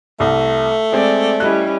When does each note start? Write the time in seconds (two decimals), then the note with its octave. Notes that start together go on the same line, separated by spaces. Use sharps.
0.20 C2 A3
0.92 G#3 C4 D5
1.40 G3 C#4 E4 D#5 F#6